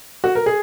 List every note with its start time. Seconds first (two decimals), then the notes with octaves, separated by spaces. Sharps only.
0.24 F#4
0.35 A#4
0.46 G#4